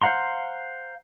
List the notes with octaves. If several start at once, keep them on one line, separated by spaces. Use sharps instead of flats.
C5 F5 F#5 A#5 C6